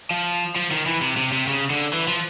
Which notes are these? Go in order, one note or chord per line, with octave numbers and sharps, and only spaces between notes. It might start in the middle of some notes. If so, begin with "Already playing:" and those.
F3
F3
D#3
E3
C3
C3
C3
C#3
D3
E3
F3